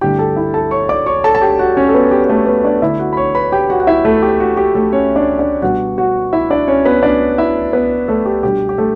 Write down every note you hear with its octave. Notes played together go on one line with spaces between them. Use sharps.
G2 D3 A3 E4 G4 G5
A4 A5
E4 E5
A4 A5
C#5 C#6
D5 D6
C#5 C#6
A4 A5
A5
G4 G5
F#4 F#5
C#4 C#5
A4
B3 B4
G4
G4
A3 A4
B3 B4
D4 D5
D3 A3 E4 E5
F#4 F#5
B5
C#5 C#6
B4 B5
G4 G5
F#4 F#5
F#5
E4 E5
A3 A4
G4
F#4
G4
A3 A4
C#4 C#5
D4 D5
D4 D5
B2 G3 B3 D4 F#4 F#5
F#4 F#5
E4 E5
D4 D5
C#4 C#5
B3 B4
D4 D5
E4 E5
B3 B4
A3 A4
G4
B2 G3 D4 G4
G4
A3 A4